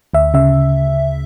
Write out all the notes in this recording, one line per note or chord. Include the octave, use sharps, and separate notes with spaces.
D2 E5
C#3 E5